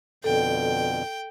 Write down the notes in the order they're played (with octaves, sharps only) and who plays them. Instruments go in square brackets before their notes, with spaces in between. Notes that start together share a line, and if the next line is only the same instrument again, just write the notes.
[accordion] F2 B2 D3 [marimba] A4 [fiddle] G5